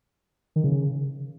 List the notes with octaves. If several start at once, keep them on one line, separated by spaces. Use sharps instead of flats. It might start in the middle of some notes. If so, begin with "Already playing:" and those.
D#3
C#3